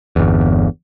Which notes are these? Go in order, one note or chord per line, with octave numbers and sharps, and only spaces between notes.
G1 E2